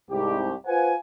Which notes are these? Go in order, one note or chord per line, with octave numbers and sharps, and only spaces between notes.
C2 G#2 G4
F4 B4 C5 F5 F#5 G#5